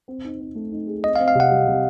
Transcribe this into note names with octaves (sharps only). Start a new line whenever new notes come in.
C4
D#4
C4
A3
D#4
G#4
C4 D#5
F5
C4
F5
C3 F#5
G3
C3